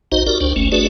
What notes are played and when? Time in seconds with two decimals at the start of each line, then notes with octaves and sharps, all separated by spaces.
0.12 A#1 D#4 F#4 C5 D#5
0.27 F#4 G4 A#4 D5
0.41 C#2 D4 C5 G5
0.56 G1 A3 C#4
0.72 A3 D4 F#4 G#4 B4 D5